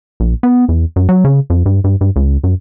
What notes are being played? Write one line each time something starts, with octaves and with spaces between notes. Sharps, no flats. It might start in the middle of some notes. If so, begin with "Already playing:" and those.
A#1
B3
E2
F#2
F#3
C#3
F2
G2
G2
G2
C#2
F#2